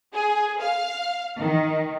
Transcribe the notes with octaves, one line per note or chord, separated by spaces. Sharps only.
G#4
F5
D#3